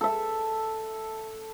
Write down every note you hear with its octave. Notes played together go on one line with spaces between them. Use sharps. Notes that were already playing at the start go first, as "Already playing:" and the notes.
A4 E5